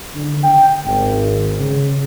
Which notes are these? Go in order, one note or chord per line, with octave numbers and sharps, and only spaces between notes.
D3
G5
G#1
C#3